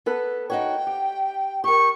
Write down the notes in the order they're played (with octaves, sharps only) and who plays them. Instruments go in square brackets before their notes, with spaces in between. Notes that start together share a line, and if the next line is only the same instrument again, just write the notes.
[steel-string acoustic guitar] B3 A4 B4
[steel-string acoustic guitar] D#4 F#4 C#5 [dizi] G5
[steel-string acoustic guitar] G4
[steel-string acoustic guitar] G4 A#4 [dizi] C#6